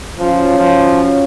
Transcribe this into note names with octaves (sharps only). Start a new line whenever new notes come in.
G#2 F3 F#3 C#4 F4
F3